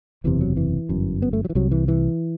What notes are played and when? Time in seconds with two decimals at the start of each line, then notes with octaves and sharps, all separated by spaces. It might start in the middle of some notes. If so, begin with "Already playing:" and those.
0.24 F#1 E2 C3 E3
0.41 F#3
0.57 E3
0.89 G1 F#2
1.22 B3
1.33 A3
1.45 F#3
1.50 E3
1.55 C2 C3 F#3
1.71 E3
1.88 E3